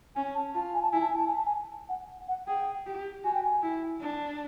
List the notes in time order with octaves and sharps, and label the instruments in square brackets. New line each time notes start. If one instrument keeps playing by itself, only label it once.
[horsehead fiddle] C#4 [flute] G#5
[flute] A5
[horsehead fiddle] F4 [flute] A5
[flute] G#5
A5
[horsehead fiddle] E4 [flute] G#5
[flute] A5
G#5
A5
G#5
A5
G#5
F#5
F#5
[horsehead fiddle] G#4 [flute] G5
[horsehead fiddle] G4
[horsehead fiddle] F#4 [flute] G#5
[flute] G5
G#5
[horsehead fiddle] E4
D4